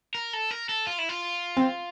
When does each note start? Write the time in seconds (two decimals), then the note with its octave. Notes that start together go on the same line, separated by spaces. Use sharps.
0.15 A#4
0.33 A4
0.51 A#4
0.69 A4
0.87 F4
0.98 E4
1.09 F4
1.57 C4